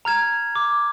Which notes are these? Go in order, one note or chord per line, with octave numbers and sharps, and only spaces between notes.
A#5 F6 G#6 E7
D6